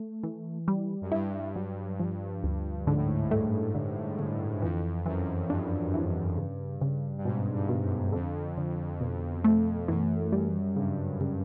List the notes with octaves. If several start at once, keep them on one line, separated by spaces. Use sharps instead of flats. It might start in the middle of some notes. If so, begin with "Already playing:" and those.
Already playing: A3
E3
G3
F#2
G2 E4
F#3
F3
D2
G#2 D3
A2
G#2
A2
G#2
G2 A3
D3
D3
F2 E3
F#2 E3
G2 D4
E3
C#3
C#3
G2
G#2 B2
G2
B2
F#2
F2 D3
D3
B2
A3
F#2 E3
G3
G2 C#3
C#3